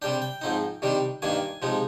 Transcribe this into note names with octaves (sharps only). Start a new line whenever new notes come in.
C3 G3 D4 G5
G5
G#2 F3 C4 D#4
C3 D#3 G3 D4
G2 D#3 A#3 D4 G#5
C3 F3 G#3 D#4